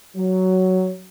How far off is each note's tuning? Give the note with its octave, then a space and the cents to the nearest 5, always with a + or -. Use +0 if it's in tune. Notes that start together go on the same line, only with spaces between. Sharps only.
F#3 +10